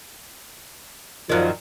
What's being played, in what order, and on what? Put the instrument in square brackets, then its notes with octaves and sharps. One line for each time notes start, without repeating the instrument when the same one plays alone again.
[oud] F#2 D#3 [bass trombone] F3